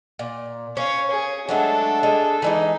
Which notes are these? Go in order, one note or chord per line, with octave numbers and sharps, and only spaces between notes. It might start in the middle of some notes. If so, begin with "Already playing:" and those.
A#2
C#4 C#5 F5
G#4
F#3 G#3 A3 D4 A4
G#3
E3 G3 G#3 D#4